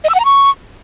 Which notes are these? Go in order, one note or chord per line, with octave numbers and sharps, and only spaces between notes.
D#5
E6
F#5
A#5
C#6